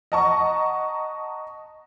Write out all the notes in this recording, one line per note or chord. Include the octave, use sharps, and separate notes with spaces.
D#5 F#5 A5 A#5 C#6